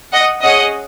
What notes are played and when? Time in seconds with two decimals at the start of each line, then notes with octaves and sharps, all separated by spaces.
0.12 D#5 F#5
0.43 C#4 G#4 D#5 F#5